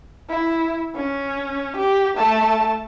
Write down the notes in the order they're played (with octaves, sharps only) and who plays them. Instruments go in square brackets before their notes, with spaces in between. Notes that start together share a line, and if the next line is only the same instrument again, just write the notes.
[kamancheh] E4
C#4
G4
A3 A5